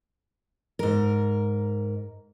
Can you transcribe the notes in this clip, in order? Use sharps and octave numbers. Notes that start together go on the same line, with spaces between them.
G#2 A#4